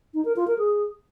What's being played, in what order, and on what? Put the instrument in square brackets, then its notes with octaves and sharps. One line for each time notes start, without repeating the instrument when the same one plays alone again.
[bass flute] D#4
A#4
F4
A#4
G#4